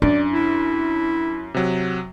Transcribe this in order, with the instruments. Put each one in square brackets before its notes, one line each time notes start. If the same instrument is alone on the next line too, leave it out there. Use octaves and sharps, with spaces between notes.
[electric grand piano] F#2 [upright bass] D4 [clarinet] D5
[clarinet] E4
[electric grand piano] C3 F#3